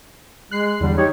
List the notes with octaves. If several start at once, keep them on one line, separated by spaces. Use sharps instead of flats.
G#3 F#6 C7
E2 D3 G3
D#4 G4 C#5